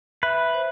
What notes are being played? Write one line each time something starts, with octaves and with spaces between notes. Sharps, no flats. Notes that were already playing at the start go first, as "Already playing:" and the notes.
B4 E5
C5